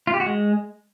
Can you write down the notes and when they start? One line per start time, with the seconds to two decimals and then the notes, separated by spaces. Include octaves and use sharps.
0.07 F4
0.14 G4
0.20 F#4
0.26 G#3